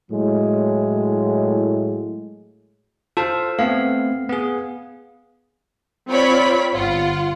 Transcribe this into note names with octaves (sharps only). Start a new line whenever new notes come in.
A2 F#3 G#3
F4 A4 C5 F5 A5
A3 B3 C4 F5
B3 G#4
C4 F4 C#5 D5 B5
G1 F4 F#5